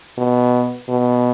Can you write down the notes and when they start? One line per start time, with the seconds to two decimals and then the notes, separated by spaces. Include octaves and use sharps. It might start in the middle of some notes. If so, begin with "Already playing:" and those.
0.18 B2
0.89 B2